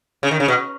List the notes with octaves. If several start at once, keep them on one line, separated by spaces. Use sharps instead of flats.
C#3
D#3
C#3
B2